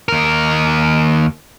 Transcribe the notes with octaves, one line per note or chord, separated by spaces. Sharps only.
D#2 A#4